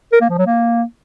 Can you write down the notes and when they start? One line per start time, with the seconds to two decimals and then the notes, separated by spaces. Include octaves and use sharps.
0.12 A#4
0.21 A#3
0.30 F3
0.38 F#3
0.47 A#3